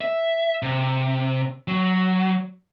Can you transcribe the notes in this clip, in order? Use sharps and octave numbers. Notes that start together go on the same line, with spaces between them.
E5
C3
F#3